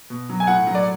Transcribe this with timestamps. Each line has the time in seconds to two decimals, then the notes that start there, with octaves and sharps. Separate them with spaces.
0.10 B2
0.29 F#3
0.40 G#5
0.47 A2 F#5
0.67 F#3
0.75 D5